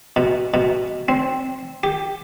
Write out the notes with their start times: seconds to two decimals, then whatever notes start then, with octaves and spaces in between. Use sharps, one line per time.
0.16 B2
0.54 B2
1.08 C4
1.83 G4